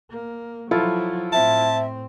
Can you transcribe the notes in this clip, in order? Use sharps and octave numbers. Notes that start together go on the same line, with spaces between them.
A#3
F3 F#3 E4 F4 A4
A2 C4 E5 A5